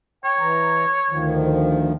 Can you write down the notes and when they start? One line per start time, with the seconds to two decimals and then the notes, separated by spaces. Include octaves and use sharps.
0.24 C#5 G5
0.40 E3 A#5
1.10 D2 D#3 F3